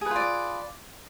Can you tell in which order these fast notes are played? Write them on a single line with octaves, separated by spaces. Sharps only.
G#4 B4 F4 D5